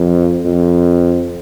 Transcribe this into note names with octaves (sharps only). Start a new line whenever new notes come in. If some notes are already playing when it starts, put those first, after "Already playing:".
Already playing: F2
F2